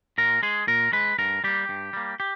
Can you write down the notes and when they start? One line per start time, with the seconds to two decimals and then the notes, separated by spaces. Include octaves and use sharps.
0.18 A#2 A#4
0.43 G#3 G#4
0.67 A#2 A#4
0.93 G#3 B4
1.19 G2 A#4
1.44 G3 A#3 G4
1.69 G2
1.93 G3 A#3
2.20 G4